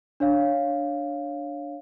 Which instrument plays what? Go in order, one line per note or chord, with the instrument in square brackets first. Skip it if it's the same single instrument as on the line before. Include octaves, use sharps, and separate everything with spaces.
[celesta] D4 C#5 F5